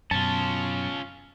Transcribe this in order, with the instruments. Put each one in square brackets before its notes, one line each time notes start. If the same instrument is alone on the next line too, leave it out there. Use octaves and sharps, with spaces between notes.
[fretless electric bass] F#2 B2 [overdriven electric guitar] C#4 F4 [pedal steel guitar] A5